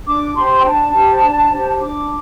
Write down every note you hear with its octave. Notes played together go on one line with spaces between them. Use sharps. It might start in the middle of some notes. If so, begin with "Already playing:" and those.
D4 D6
G4 C5 C6
G5
D4 A5
G4 C5
D4
G4 C5
D4 D6